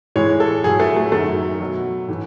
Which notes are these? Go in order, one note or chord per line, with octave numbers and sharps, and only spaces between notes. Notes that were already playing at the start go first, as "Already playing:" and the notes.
A2 E3 G#3 C#5
A4
A2 F#3 G#4
A3
A3
F#2 D#3 F#3 A3
B2 F#3
A2 E3